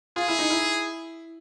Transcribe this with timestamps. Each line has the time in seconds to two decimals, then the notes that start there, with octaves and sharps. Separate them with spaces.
0.16 F4 G#4
0.28 E4
0.39 D#4
0.50 E4